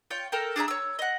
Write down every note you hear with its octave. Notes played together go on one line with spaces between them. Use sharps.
F4 C#5 G5
A4 A#4 G5
D4 G#4 E5 A#5
C#5 E6
D#5 F#5